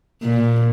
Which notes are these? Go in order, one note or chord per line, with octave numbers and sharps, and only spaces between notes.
A#2